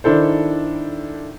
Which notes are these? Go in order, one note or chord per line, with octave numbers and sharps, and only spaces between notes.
D#3 D4 E4 A4 C5